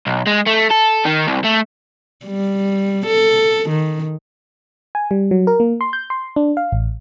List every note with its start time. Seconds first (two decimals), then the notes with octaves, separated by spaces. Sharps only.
0.07 B1
0.27 G#3
0.47 A3
0.71 A4
1.05 D#3
1.27 C2
1.44 A3
2.26 G3
3.06 A4
3.70 D#3
4.95 G#5
5.11 G3
5.31 F#3
5.47 A#4
5.60 A#3
5.81 C6
5.93 G6
6.10 C6
6.36 D4
6.57 F5
6.72 A1